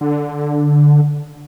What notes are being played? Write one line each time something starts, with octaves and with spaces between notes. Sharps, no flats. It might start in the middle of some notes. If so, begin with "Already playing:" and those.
D3